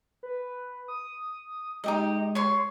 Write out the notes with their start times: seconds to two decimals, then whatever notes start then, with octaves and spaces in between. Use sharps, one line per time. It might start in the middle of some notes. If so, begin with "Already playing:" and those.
0.23 B4
0.88 D#6
1.84 G#3 D#4 G4 D#5
2.35 C#5 C6